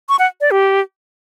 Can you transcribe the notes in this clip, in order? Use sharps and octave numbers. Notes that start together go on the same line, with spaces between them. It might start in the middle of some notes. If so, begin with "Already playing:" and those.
C#6
F#5
D5
G4